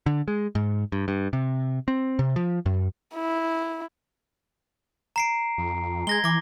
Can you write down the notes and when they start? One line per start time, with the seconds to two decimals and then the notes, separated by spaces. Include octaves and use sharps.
0.06 D3
0.28 G#3
0.55 G#2
0.92 G2
1.08 G2
1.33 C3
1.88 C4
2.19 C3
2.36 F3
2.66 F#2
3.15 E4
5.16 A#5 C7 D7
5.58 F2
6.07 G#3 G#6 A#6 G7
6.24 E3 D6 A#6